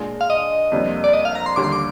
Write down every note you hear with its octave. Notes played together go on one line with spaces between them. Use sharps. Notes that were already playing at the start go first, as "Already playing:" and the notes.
Already playing: A#2 G#3 D4 F4
F5
D#5
F2 C3 G3 A#3 D4
D5
D#5
F5
A#5
C6
D#2 D3 G3 D6
C6
D6